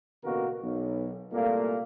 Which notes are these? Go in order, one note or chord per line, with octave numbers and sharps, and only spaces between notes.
A1 D2 B2 A#3 F#4 A#4
B1
C2 A#2 A3 A#3